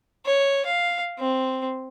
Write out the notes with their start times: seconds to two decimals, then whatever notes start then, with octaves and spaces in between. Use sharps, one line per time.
0.25 C#5
0.66 F5
1.18 C4